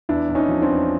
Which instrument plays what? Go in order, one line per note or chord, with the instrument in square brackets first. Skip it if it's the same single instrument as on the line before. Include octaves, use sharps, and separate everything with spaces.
[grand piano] E2 D4 E4
E2
C#4 D#4
F3
C4 D4
E2